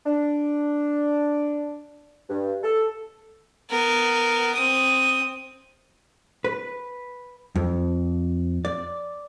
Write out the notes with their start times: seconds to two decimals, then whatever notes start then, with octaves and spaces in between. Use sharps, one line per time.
0.06 D4
2.29 G2
2.63 A4
3.70 B3 A#4
4.55 C4 D#6
6.44 B4
7.56 F2
8.65 D5